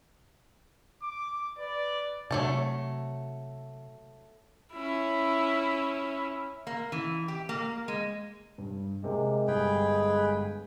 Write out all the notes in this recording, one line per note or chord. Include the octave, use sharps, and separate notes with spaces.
D6
B4 D5
C3 F#3 A3 A5
C#4 E4
A#3
E3
G4
A#3
G#3
G2
C3 G#3 A#3
G1 G#4 B4 G5